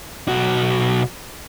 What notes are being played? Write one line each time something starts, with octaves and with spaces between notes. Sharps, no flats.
B1 F#4